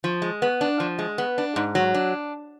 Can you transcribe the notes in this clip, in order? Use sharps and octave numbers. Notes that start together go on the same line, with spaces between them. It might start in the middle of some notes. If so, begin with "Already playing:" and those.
F3
G#3
B3
D4
F3
G#3
B3
D4
G#2
F#3
D4